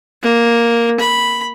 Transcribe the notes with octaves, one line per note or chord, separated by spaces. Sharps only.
A#3
B5